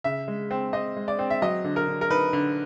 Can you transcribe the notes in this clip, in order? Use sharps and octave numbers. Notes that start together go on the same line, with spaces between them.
C#3 E5
G#3
C4
C4 D#5
G#3
D5
C4
E5
F#3 D#5
D3
A#4
D3
A#4
D#4 B4
D3